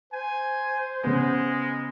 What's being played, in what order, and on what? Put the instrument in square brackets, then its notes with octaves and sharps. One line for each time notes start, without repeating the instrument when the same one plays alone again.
[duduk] C5 [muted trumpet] G#5
[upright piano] C#3 B3 [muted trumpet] G#3